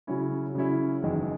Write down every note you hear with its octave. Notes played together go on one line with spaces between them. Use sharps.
C#3 F#3 C#4 E4
C#3 F#3 C#4 E4
F#1 E2 D#3 G#3